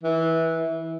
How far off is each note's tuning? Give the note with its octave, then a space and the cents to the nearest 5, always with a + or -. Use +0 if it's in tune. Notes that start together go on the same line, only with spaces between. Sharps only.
E3 -15